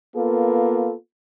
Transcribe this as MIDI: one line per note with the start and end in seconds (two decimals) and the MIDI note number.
0.16 0.93 58
0.16 0.93 59
0.16 0.93 65
0.16 0.93 69
0.16 0.93 71